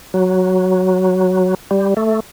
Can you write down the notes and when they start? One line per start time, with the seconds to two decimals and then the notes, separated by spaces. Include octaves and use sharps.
0.14 F#3
1.71 G3
1.97 A3